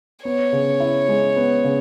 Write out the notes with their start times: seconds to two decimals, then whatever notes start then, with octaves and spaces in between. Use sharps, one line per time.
0.24 B3 C#5
0.53 C#3
0.80 E4
1.09 G#3
1.37 B3
1.64 C#3